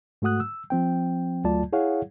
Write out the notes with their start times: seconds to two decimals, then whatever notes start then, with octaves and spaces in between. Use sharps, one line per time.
0.22 G#2 A3 F#4 F#5 D#6 F#6
0.40 E6
0.70 F3 C4 G5
1.44 D2 F#3 A3 F4 D5 A5
1.73 E4 G#4 C#5 F5 F#5